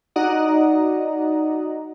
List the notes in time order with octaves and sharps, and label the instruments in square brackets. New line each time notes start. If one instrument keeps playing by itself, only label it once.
[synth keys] D#4 F#4 D5 D#5 F#5 A#5